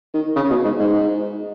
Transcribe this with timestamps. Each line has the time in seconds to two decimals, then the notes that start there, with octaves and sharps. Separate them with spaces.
0.14 D#3
0.36 C#3
0.50 B2
0.65 G#2
0.80 G#2